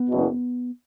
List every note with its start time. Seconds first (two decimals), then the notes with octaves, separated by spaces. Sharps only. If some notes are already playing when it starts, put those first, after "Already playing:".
Already playing: B3
0.09 F#1 E2 B2